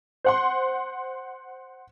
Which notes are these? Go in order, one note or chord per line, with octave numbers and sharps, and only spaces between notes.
C5 F#5 C6